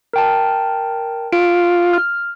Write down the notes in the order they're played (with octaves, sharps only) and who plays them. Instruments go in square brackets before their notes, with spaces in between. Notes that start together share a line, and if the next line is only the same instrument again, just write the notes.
[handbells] A#4 G5 A5
[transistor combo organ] F4 [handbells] D7
[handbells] F6